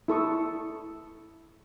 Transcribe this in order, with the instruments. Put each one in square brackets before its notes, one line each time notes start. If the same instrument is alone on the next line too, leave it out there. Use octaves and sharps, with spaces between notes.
[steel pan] E4 A4 C#6 D#6